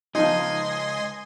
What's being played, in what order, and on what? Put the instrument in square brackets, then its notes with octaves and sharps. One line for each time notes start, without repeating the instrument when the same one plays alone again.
[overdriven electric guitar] C#2 G2 [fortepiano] F3 D#4 [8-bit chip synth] D#5 G#5 C6